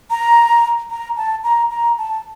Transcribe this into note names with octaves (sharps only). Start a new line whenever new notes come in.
A#5
A#5
A5
A#5
A#5
A5